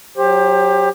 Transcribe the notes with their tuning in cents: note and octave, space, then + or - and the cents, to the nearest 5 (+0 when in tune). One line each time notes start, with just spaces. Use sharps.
F#3 +0 G4 +20 C5 +25